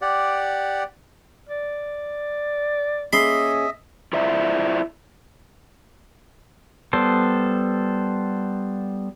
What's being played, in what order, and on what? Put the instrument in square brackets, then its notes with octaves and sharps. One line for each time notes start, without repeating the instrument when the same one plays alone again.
[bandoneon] G4 D5 F#5
[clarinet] D5
[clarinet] A#3 [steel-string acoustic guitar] C#4 G#4 [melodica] D#5 E5 [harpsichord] B5 C6
[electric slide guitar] E4 F4 C5 D5 E5
[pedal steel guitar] G3 B3 A4 C5